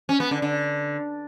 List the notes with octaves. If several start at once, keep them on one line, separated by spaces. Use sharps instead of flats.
C#4
B3
D3
D3